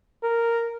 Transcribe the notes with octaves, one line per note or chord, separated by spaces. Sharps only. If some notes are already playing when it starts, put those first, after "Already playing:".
A#4